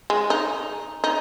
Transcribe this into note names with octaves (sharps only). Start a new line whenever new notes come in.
G#3
D#4
D#4